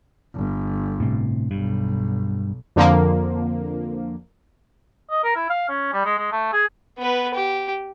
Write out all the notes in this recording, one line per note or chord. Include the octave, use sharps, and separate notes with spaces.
G1
A2 C3
B1 G2
F2 D3 F3 A#3
D#5
A#4
E4
F5
C#4
G3
G#3
G#3
A3
G#4
B3 B4
G4